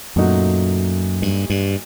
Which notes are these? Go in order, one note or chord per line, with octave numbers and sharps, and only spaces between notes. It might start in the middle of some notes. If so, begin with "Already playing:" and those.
F#2 A#2 F#3 A3 D#4 F#4
G2
G2